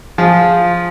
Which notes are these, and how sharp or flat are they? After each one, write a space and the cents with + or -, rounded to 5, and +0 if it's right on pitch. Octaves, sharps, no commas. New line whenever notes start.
F3 +0 F4 +0 G#4 -10